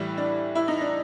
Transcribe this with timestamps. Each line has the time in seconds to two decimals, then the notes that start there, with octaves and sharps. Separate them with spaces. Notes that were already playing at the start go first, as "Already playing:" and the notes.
Already playing: A2 E3 G3 E4
0.17 D4
0.55 E4
0.68 D#4
0.81 D4